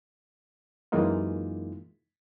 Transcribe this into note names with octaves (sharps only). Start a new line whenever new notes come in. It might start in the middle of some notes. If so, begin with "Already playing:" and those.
F#2 E3 G#3 A#3 D#4 F4